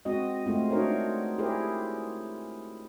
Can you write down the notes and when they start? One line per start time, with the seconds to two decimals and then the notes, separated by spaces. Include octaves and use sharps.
0.05 G#3 C4 F#4 D#5
0.46 G#3 A3 C4 F4
0.70 D4 D#4 F#4 A#4 C5 C#5
1.38 E4 G4 G#4 A#4 C5